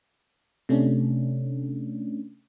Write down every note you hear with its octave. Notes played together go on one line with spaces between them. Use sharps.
C3 A3 C#4 D4